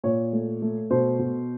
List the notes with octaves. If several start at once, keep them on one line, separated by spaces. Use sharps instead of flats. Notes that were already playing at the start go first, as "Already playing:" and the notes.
A#2 C#5
A3
A3
B2 C5
B2